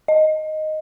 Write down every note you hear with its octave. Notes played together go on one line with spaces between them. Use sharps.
D#5